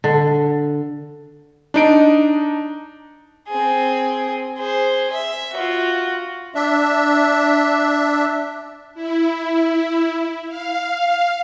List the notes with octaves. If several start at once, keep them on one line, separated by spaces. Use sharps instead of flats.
D3
D4 D#4 D7
C4 G#4
G#4 C5
E5
F4 F#4
D4 E5
E4
F5